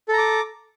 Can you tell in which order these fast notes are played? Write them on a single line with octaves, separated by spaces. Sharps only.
A4 A#5 D6